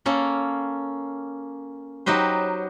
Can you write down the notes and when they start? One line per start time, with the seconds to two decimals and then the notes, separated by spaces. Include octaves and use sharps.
0.06 A#3 C#4 A4
2.06 F#3 D#4 G4 B4 C5